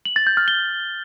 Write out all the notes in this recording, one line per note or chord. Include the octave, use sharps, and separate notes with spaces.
F#7
A6
G6
F6
G7